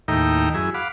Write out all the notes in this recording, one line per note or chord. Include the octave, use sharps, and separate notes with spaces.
D#2 A2 D#4 E5 G5 A#5
F#2 E4 G#4
F5 F#5 B5 D6